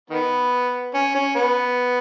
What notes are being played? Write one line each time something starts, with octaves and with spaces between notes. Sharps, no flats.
D#3 B3
C#4
C#4
B3